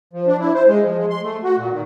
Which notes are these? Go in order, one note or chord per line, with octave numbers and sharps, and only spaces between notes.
F3
D4
E4
C5
G#3
F3
G#3
C6
A3
F#4
A#2
D#3